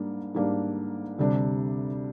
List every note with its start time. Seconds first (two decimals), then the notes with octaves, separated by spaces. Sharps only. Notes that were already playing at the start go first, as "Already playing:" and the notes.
Already playing: G#2 G3 A#3 D4
0.34 G#2 G3 A#3 D4
1.18 D2 C3 G3 D4